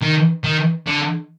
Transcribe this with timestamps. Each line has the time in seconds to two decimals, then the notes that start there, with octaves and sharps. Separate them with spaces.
0.02 D#3
0.44 D#3
0.86 D3